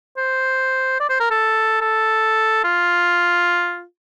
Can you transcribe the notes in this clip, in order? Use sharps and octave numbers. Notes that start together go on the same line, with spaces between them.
C5
D5
C5
A#4
A4
A4
F4